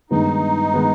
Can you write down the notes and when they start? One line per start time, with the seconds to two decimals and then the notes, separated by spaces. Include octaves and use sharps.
0.10 G2 D#3 G#3 B3 D#4
0.74 D#3 G#3 B3